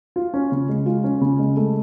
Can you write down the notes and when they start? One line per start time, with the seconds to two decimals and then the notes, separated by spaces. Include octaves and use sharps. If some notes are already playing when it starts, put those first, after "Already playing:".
0.16 F4
0.34 C#4
0.52 C#3
0.69 G#3
0.86 F4
1.04 C#4
1.21 C#3
1.39 G#3
1.57 A3